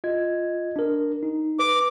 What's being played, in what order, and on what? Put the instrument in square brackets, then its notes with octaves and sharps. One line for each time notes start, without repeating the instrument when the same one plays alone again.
[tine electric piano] F4 D#5 G#6
D4 A#4
D#4
[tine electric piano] B4 [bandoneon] D6